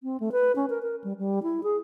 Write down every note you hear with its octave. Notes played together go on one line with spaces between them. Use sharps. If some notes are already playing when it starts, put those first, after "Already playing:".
C4
A3
B4
C#4
A#4
A#4
G3
G3
E4
G#4